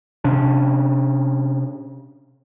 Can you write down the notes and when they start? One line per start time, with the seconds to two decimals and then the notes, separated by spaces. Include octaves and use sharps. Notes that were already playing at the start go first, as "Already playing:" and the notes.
0.24 C3 C#4 D4